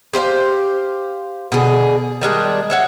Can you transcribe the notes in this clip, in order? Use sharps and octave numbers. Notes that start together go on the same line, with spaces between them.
G4 C5 D#5 F5
B2 D3 G#4
D#3 G3 G#3 D4
F#4 C#5 E5